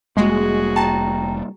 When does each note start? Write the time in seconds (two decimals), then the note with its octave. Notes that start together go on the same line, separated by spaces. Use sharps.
0.17 F1 G3 G#3 A#3 F#4 G#4
0.76 G5 A5 A#5